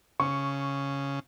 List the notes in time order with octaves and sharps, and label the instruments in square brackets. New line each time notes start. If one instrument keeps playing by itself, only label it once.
[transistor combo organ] C#3 [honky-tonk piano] C#6